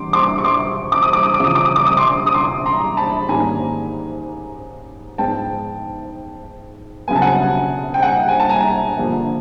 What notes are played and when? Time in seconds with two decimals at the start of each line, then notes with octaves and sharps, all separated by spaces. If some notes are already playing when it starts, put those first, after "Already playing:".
Already playing: E2 B2 G3 C6 D6
0.13 C6 D6
0.38 C#6
0.44 C6 D6
0.92 D6
1.03 D#6
1.13 D6
1.23 D#6
1.34 D6
1.40 E2 C#3 F3
1.45 D#6
1.55 D6
1.66 D#6
1.76 D6
1.87 D#6
1.97 C6 D6
2.26 D#6
2.34 C6 D6
2.66 A#5 C6
2.97 A5 B5
3.29 G#2 D#3 G3 A#3 C#4 G#5 A#5
5.18 G#2 F3 G#3 B3 G5 A5
7.08 C#3 F#3 B3 G#5
7.15 A5
7.22 F#5 G#5
7.94 G5
8.02 F#5 G#5
8.28 G#5
8.40 A5
8.49 G#5 A#5
8.98 G2 D3 F3 A#3